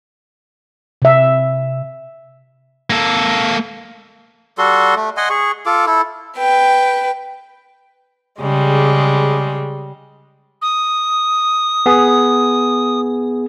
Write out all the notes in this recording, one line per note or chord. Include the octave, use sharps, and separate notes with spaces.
C3 E5
A#3 A4
G3 F#4 A4 C6
A3
D#5 F#5 G#5 C6
G#4 C#6
F4 A4 D6
E4 A4
B4 G5
C#3 G3 G#3
D#6
B3 G#4